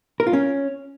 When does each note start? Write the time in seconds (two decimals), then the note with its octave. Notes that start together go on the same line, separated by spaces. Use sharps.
0.20 A#4
0.27 F4
0.33 C#4